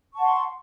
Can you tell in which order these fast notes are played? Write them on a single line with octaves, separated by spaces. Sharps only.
C#6 A5 F#5 C6